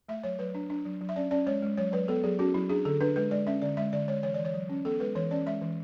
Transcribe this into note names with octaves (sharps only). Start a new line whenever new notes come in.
A3 E5
F#3 C#5
F#3 B4
D4
D4
F#3
F#3
E5
C#4 D5
C#4 D5
G#3 C#5
G#3
F#3 C#5
F#3 B4
B3 A4
F#3 G#4
C#4 F#4
F#3 E4
D4 G#4
D3 A4
D4 B4
G#3 B4
G#3 D5
C#4 E5
D3 D5
G#3 E5
D3 D5
G#3 C#5
E3 C#5
E3 D5
C#5
F#3
C#4
B3 A4
G#3 B4
E3 C#5
C#4 D5
G#3 E5
E3